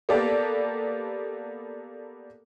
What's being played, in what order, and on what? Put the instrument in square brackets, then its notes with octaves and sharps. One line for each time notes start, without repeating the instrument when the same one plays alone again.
[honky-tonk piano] A#3 B3 G4 A4 D5